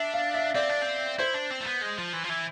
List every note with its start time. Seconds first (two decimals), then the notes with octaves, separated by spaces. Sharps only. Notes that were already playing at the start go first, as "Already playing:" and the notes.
Already playing: D4 E5
0.14 F5
0.34 E5
0.55 C4 D5
0.69 D4
0.82 C4
1.19 E4 C5
1.34 D4
1.50 C4
1.61 A3
1.67 B3
1.82 G#3
1.98 F3
2.13 E3
2.24 F3
2.29 E3